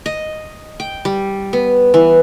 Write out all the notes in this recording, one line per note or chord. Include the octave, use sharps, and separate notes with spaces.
D#5
G5
G3
B3
E3